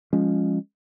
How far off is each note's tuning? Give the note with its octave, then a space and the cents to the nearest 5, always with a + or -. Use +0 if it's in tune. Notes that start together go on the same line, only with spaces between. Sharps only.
F3 +0 G#3 -15 C#4 +0